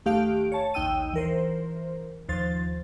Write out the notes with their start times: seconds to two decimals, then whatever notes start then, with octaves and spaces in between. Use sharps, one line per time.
0.06 D#2 A3 G4 F5 D7
0.52 C#5 A5
0.74 A#1 D#2 D#4 G5 E6 D#7
1.13 E3 A#4 C5
2.29 D#2 F3 C5 A6